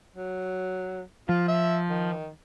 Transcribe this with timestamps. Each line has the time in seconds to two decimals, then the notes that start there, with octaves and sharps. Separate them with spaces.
0.16 F#3
1.29 F3 F4
1.48 E5
1.90 D#3